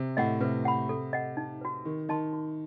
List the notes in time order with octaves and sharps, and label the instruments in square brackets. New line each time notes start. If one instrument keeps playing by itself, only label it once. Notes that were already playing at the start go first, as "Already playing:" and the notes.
Already playing: [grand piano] C3
[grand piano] A2 [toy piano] D#5 F#5
[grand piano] C3 [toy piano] B4
[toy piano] F#5 B5
A4
D#5 F#5
D#4
F#4 B4
[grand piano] D#3 [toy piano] G4
[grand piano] D#3 [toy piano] D#5 A5 C6
[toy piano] F#4